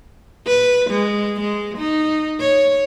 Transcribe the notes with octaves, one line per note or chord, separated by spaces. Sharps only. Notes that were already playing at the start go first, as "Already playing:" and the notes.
B4
G#3
G#3
D#4
C#5